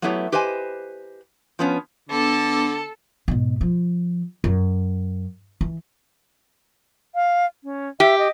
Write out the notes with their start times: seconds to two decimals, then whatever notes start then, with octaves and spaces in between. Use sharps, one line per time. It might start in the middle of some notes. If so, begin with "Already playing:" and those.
0.02 F#3 A3 B3 E4 G4 C#5
0.32 G4 B4 C5 D#5 G#5
1.59 F3 B3 C#4
2.09 D3 B3 D4 A4 B4
3.28 G#2 B2
3.61 F3
4.44 F#2
5.61 E3
7.15 F5
7.64 C#4
8.00 G4 E5
8.19 D#5